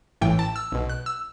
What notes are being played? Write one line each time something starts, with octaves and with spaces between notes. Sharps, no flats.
A1 A2 E3 G5
A5
E6
B1 B2
F#6
E6